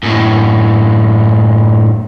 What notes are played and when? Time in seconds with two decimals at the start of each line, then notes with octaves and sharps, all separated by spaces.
0.03 F#2 A2